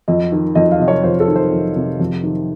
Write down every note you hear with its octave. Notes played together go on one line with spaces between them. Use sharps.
F2 D#5
D#3
F2 D#5
F5
C3 D#5
C#5
F2 C5
A4
D#3
C5
F2
C3
F2
D#3